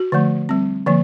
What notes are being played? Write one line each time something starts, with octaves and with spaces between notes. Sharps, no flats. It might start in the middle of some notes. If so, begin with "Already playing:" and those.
Already playing: F#4
D3 F3 A3
G3 C4
D3 F3 A#3